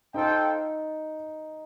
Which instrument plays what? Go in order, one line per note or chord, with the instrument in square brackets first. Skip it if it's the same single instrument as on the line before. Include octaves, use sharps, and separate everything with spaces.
[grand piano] D#4 [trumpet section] F4 A4 C5 G5